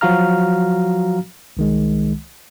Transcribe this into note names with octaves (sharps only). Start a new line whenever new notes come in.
F3 F#3 F#4 F5 A#5 F6
C2 D#3 G#3